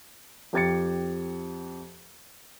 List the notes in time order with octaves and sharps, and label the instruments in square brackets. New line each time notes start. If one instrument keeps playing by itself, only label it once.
[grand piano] F2 G4 G#6 A6 C#7